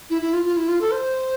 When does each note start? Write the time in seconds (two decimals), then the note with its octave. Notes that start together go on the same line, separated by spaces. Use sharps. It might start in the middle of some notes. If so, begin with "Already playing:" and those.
0.10 E4
0.21 E4
0.33 F4
0.45 F4
0.56 E4
0.68 F4
0.81 A4
0.92 C5